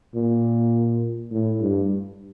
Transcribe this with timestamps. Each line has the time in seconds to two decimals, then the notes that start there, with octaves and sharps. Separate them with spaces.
0.15 A#2
1.31 A2
1.61 G2